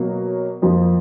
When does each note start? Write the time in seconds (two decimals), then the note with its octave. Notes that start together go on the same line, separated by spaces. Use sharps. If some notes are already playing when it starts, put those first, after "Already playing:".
Already playing: B2 F#3 A#3
0.62 F2 F3 A#3